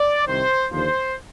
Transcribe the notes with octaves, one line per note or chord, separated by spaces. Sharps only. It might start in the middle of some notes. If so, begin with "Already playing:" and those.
Already playing: D5
C2 C3 D#3 C5
D#2 D3 F3 C5